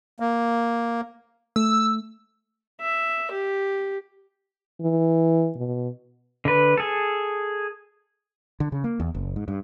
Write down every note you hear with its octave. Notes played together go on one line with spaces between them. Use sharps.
A#3
A3 E6
E5
G4
E3
B2
D3 B4
G#4 A4
D3
C#3
A#3
E2
F#1
G#2
G2